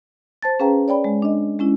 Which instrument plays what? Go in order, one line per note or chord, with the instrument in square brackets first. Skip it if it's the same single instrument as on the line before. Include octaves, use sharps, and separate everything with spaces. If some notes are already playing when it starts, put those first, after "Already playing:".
[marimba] C5 A5 A6
C#4 G#4 B4 F5 G5 A#5
C#5 D5 G5 B5
G#3
D4 D#5
G#3 C#4 E4